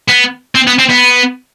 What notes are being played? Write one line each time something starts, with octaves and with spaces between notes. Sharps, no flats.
B3
C4
B3
C4
B3